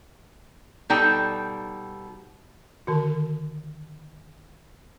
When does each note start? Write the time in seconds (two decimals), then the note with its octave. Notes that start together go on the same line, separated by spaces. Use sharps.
0.90 B2 G3 D#4 A4 G5
2.87 D3 D#3 F#4